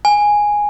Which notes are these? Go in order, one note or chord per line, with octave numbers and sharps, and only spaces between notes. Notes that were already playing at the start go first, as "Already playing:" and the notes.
G#5